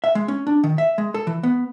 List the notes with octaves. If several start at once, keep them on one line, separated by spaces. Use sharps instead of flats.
E5
G#3
C#4
D4
D#3
E5
G#3
A4
E3
B3